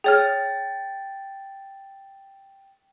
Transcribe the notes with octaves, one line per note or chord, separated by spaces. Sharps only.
G#4 C#5 G5 F6 A6